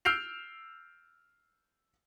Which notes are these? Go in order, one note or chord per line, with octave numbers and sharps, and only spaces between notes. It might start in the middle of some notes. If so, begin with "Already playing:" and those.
E6 F6 G6 C7 D7 F7